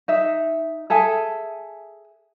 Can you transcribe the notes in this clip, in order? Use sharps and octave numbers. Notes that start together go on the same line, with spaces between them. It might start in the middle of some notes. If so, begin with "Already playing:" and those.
D#4 E5
G#4 A4 E5 G#5